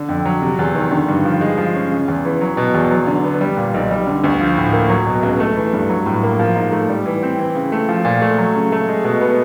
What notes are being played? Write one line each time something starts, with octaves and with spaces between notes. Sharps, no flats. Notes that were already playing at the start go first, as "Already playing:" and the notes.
Already playing: D3
F2
F#3
C3
E2
D#3
D3
G2
F3
G#3
F3
C#4
C#3
E2
E3
F#3
B2
E2
F#3
D3
B3
G3
A#2
B1
G3
D3
D2
F3
A2
A#3
F#3
B2
C#2
A3
E3
G2
F#3
A2
A#3
F3
G#2
A3
G3
E3
C4
E3
C#3
A3
F3
A#2
A3
F#3
C#3
A3
G#3
B2
B3